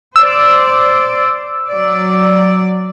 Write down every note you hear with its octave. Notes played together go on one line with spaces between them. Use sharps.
C5 D5 E6
F#3 D5